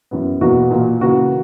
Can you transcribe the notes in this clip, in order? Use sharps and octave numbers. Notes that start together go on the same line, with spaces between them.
F#2 E3 B3
E2 B2 A#3 F#4
A#2 A#3
C#3 E3 A#3 F#4